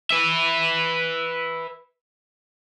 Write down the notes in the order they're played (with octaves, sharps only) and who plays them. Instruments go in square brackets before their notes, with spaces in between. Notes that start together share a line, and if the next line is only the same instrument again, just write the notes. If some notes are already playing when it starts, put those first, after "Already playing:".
[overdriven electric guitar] B4 E5